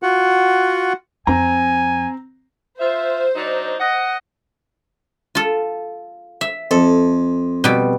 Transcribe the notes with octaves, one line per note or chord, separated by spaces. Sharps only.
F4 F#4 F#5
F2 C4 G#5 A#5
F4 C5 E5
F#3 D4 D#4
D#5 F#5
F4 A4
E5
F2 A4
B2 G3